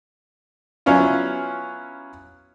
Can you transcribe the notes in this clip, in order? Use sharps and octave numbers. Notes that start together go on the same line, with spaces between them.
F#3 B3 C#4 E4 F4